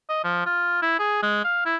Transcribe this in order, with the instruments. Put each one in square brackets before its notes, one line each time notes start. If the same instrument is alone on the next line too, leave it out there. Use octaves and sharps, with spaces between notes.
[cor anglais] D#5
F3
F4
E4
G#4
G#3
F5
E4